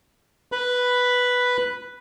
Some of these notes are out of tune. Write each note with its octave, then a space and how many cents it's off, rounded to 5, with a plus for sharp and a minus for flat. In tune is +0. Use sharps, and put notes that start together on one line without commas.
B4 +0 B5 +0